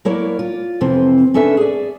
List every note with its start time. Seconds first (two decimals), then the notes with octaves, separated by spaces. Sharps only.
0.05 F#3 A#3 E4 A#4 C#5 D5
0.39 F4
0.81 F2 C3 E3 C4
1.34 C#4 D4 A4 B4 E5
1.57 G#4 D5